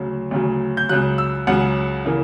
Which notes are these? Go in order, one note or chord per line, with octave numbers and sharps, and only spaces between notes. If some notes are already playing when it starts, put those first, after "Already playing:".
Already playing: D2 C#3 F#3
D2 C#3 F#3
G6
C#2 C#3 F#3 F#6
E6
C#2 C#3 F#3 F#5
C#3 E3 A#3